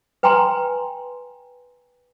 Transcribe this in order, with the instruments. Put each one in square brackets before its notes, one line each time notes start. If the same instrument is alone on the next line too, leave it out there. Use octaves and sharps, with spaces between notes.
[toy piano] B4 G5 G#5 A#5 C6